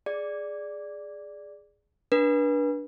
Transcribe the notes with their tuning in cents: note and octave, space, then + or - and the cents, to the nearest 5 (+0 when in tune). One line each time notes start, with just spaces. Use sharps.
G#4 +0 D5 +0
D4 -5 B4 -30